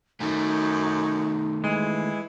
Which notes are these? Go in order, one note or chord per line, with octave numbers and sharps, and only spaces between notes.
F#2 D#3 A3 D#4
E3 G#3